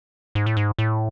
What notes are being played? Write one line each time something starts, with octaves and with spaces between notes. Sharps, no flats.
G#2
A2
G#2
A2